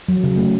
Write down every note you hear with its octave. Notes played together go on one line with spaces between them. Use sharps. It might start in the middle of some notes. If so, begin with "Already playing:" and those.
F#3
C#3
A3